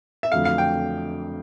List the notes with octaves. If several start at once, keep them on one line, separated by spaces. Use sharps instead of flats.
E5
F2 D3 F#3 A3 F5
F5
G5